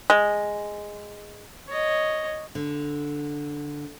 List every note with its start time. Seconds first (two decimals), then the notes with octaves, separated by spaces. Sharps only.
0.10 G#3
1.68 C#5 D#5
2.55 D3